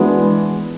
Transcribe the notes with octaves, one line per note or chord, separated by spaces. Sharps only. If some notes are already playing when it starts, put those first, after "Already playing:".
Already playing: E3 G#3 B3 D4 F#4